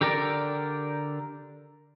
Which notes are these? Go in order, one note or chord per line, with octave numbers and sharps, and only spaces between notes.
D3 G4 A#4 D5